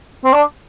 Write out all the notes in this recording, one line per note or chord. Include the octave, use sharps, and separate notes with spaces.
C4
D4